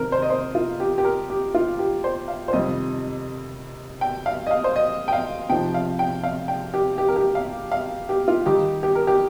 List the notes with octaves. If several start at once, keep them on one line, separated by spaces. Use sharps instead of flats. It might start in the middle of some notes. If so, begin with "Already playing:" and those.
Already playing: C3 D#3 C4 A#4
C5
D#5
C5
F4
G4
G4
A#4
G4
F4
G4
C5
F5
C5
F2 C3 D#3 G3 D#5
G5
F5
D#5
F5
C5
D#5
G5
F5
C3 F3 D#4 G5
F5
G5
F5
G5
G4
G4
A#4
G4
F5
F5
G4
F4
D#3 G3 D#4 G4
G4
A#4
G4